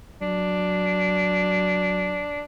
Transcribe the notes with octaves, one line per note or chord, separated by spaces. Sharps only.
F#3 D4